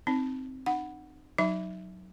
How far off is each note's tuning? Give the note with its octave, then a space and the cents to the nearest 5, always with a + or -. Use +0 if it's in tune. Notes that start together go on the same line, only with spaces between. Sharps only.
C4 +0 D#4 +0
D#4 -35 F#5 +0
F#3 +0 D#4 +0 E5 +0